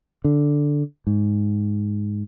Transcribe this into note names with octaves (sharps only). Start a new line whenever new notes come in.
D3
G#2